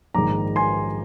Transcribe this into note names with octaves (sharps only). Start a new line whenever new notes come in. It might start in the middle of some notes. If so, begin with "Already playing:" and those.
A#1 G#2 D#3 G#3 A#5 D6
G#5 C6